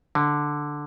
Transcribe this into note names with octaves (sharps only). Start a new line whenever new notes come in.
D3